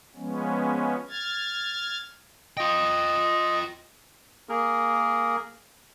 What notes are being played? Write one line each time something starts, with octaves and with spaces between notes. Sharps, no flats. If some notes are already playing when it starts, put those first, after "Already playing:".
F3 G#3 B3 C#4
F6 G#6 A6
F4 D#5 G5
A#3 G#4 A#4